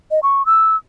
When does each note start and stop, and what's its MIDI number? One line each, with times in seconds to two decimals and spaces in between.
0.11 0.20 75
0.23 0.45 85
0.46 0.76 88